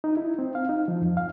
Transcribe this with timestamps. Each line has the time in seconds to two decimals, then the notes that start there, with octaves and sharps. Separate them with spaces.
0.04 D#4
0.17 E4
0.39 C4
0.55 F5
0.69 D#4
0.88 F3
1.02 F2
1.17 F5